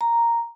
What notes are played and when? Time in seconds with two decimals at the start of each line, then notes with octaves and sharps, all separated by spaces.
0.01 A#5